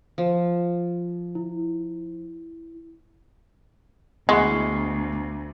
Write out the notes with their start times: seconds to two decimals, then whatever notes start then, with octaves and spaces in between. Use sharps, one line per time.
0.18 F3
1.35 E4
4.29 D2 G#3 B3 E4 G#4 F#5 C#6 C7